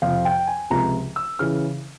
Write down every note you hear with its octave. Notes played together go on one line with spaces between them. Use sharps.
F2 C3 F3 F5
G5
G#5
C#2 C3 F3 A#5
E6
C#3 E3 F6